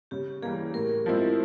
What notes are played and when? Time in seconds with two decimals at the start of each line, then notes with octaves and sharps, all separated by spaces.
0.11 C#3 G4
0.42 E3 G3 A#3 G#4
0.74 A2 A#4
1.06 F3 G#3 C4 E4